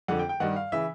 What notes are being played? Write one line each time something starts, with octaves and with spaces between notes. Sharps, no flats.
F2 D3 F#5
G5
G5
G2 D#3 F#5
F5
C#3 E3 E5